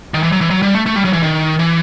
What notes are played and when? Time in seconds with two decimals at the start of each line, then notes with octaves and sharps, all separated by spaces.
0.14 D#3
0.23 E3
0.32 F#3
0.41 E3
0.50 F#3
0.62 G3
0.74 A3
0.86 A3
0.96 G3
1.05 F#3
1.13 E3
1.23 D#3
1.59 E3